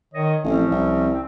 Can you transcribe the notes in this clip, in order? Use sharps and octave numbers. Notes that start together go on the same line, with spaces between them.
D#3 C#5 D#5
A1 F3 C4 C#4
C2
C4